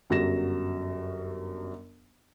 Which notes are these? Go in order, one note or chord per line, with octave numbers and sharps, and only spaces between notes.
G1 F#2 F#3 G3 A#6 E7